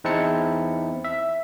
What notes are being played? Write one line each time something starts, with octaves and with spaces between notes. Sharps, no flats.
E2 C4 D#4 E4 A5 C#7
E5